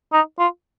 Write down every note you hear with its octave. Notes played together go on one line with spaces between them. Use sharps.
D#4
F4